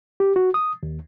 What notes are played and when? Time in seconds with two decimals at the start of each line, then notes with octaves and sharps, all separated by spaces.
0.20 G4
0.36 F#4
0.54 D#6
0.83 D#2